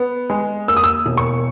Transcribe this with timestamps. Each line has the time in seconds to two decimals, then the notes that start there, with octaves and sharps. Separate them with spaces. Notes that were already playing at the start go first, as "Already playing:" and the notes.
Already playing: B3
0.30 G#3
0.68 A#3 E6
0.77 D#6
0.84 E6
1.06 E1
1.17 C#6